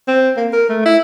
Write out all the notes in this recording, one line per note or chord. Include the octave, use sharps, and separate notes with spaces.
C4
A#3
A#4
A3
E4